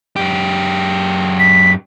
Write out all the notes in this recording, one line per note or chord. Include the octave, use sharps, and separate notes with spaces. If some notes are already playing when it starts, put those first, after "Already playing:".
F#2 G4
B6